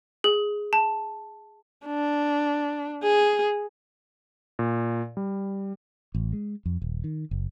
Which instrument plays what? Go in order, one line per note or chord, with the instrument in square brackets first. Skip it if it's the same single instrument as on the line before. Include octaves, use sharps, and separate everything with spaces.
[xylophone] G#4
A5
[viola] D4
G#4
[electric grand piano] A#2
G3
[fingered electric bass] A1
G#3
F2
D#1
D#3
F#1